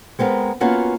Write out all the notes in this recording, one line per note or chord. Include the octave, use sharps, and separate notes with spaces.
G#3 B3 C4 A4 A#4
A#3 B3 C#4 F4 F#4